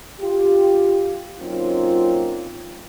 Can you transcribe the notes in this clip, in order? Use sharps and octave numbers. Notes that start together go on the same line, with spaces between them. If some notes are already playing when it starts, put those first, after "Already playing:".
F4 G4
F#3 A#3 C4 C#4 D#4 F4